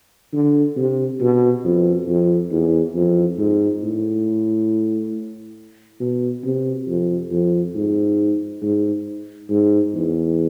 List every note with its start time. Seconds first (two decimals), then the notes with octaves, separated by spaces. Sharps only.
0.33 D3
0.76 C3
1.21 B2
1.64 F2
2.08 F2
2.51 E2
2.95 F2
3.38 G#2
3.82 A2
6.00 B2
6.44 C3
6.88 F2
7.31 F2
7.75 G#2
8.62 G#2
9.50 G#2
9.94 E2